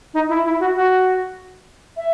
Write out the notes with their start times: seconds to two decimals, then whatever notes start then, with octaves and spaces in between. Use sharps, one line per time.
0.14 D#4
0.29 E4
0.45 E4
0.60 F#4
0.75 F#4
1.97 E5